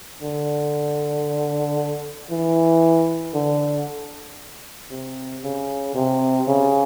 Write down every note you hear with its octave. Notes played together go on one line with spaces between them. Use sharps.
D3
E3
D3
C3
C#3
C3
C#3